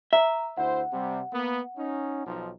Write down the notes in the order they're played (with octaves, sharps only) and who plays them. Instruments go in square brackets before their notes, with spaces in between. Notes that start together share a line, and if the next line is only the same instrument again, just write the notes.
[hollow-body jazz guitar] E5 [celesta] A#5
[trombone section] D2 E4 C5 [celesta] F#5
[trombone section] C3 G3
A#3 B3
C#4 D#4
B1 F3 D#4